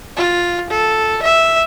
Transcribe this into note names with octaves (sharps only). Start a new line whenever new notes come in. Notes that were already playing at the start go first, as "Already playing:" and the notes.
F4
A4
E5